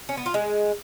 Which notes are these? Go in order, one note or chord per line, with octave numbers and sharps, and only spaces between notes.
C#4
B3
F4
G#3